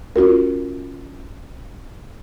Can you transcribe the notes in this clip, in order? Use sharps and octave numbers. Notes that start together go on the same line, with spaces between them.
C#4 F4 F#4 A#4